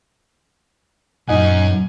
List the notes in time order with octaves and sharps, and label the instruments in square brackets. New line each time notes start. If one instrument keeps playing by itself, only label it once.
[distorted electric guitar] F#2 [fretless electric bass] A#2 [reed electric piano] D#4 D#5 F#5 [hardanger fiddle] G#5